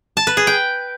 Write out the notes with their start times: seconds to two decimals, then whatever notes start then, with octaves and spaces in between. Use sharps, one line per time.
0.17 A5
0.27 B4
0.37 G#4
0.47 G5